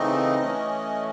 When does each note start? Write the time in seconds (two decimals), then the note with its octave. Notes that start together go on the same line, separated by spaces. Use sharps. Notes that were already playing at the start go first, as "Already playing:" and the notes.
Already playing: C#3 E3 A3 C4 D#4 D#5
0.40 E3 A3 C#4